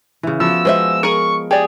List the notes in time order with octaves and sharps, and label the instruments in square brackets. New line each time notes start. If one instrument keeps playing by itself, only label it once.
[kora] C#3 E3
[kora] F3 B3 F#4 [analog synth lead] E6
[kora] G#3 [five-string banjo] B3 C5 E5
[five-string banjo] G#4 A#4 [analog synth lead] C#6
[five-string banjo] G4 D5 [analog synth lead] G#4